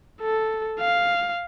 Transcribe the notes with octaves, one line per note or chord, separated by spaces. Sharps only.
A4
F5